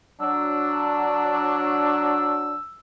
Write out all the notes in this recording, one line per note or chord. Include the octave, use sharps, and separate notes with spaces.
F#3 D4 E6